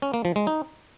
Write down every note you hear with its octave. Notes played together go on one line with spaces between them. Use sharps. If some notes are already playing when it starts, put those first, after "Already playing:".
C#4
A#3
F3
G#3
D#4